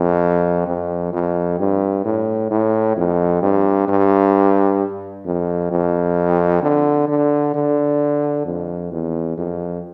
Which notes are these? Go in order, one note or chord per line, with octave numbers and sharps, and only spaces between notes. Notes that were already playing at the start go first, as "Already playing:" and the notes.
Already playing: F2
F2
F2
G2
A2
A2
F2
G2
G2
F2
F2
D3
D3
D3
F2
E2
F2